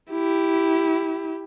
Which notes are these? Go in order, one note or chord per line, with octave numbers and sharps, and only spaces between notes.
E4 G4